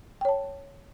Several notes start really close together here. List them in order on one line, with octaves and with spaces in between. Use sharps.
G5 C#5 A5